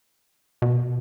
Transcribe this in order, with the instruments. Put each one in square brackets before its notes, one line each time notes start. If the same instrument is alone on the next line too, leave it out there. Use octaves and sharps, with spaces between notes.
[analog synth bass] B2